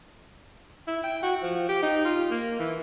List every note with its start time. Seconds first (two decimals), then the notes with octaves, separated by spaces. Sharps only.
0.87 E4
1.04 G5
1.23 F#4
1.43 F3
1.69 G4
1.83 D#4
2.05 F4
2.31 A#3
2.59 E3